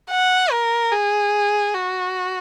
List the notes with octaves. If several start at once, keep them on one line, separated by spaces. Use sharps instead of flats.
F#5
A#4
G#4
F#4